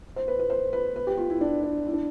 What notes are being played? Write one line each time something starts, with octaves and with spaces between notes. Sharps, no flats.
C5
B4
B4
C5
B4
B4
G4
F4
E4
D4
D4
E4
D4